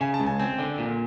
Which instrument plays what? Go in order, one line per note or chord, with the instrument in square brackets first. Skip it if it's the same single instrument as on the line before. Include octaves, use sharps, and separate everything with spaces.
[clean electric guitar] C#3 [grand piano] G#5
[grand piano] A5
[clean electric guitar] C#2
[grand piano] G#5
[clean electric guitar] C4 [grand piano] G#5
[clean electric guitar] D3
A#2